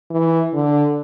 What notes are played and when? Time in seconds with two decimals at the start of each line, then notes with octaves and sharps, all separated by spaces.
0.11 E3
0.54 D3